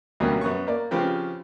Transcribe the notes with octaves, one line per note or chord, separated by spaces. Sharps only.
D2 B2 F#3 G3 A#3 C#4
F#2 B3 C#6
A#3 D5
C#3 F3 C4 G4 B4